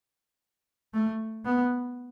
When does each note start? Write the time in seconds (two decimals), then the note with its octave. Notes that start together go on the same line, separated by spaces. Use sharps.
0.94 A3
1.45 B3